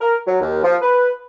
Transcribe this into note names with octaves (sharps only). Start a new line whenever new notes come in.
A#4
F#3
D#2
F3
B4